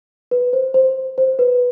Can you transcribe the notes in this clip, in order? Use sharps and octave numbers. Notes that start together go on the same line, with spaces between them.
B4
C5
C5
C5
B4